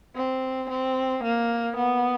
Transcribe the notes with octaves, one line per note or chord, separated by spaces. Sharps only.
C4
C4
A#3
B3